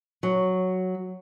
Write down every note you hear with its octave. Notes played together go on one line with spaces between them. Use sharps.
F#3